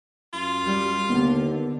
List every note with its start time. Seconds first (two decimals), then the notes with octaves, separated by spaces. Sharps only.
0.33 F#2 F4
0.65 G3
1.09 D#2 D3 B3